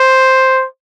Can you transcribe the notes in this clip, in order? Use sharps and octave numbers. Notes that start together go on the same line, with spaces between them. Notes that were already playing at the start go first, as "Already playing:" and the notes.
Already playing: C5